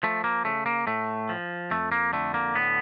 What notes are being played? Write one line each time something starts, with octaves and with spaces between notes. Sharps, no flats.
F3 A3
A#3
C#3 A3
A#3
A2 A3
F3
F2 A3
A#3
D3 A3
A#3
A2 B3